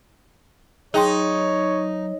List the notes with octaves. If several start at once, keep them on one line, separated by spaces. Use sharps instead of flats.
F#3 D#4 G#4 C#5 G5 C6